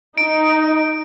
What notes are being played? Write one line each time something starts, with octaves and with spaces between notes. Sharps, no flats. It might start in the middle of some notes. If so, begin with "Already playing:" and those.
D#4 D7